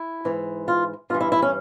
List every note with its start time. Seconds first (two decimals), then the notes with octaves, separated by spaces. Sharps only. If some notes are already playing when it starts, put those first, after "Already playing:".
Already playing: E4
0.25 G#2 E3
0.68 F4
1.10 G2 F4
1.14 E3
1.21 E4
1.32 E4
1.42 C#4